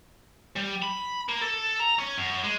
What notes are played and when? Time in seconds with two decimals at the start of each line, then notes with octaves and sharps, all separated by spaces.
0.56 G3
0.82 B5
1.29 A#3
1.42 A4
1.80 A#5
1.99 C#4
2.18 F#2
2.44 G#3